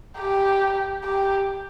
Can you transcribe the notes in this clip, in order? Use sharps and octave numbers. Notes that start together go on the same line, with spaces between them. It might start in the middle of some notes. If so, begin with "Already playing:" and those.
G4
G4